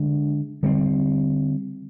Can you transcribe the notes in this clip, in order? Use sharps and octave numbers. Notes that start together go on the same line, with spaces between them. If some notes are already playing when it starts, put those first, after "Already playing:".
Already playing: D3 G#3 D4
D3 G3 C4